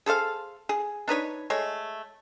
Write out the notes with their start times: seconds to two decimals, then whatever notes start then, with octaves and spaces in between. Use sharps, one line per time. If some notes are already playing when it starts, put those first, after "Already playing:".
0.06 G#4 A4 C5 F5
0.69 G#4
1.08 D4 D#4 B4 C#5
1.50 G#3 A3 C#5